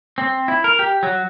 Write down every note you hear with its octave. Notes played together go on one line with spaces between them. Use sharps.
C4
E4
A#4
G4
F#3